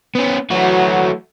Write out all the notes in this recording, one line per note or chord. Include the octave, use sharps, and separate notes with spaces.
B3 C#4
E3 F#3 A3 F#4